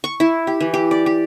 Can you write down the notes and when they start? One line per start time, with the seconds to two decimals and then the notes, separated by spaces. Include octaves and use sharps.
0.04 C#6
0.20 E4
0.47 G4
0.61 E3
0.74 G4
0.91 D5
1.06 G4